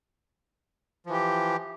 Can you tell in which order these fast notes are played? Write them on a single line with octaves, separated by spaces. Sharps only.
F3 E3 G4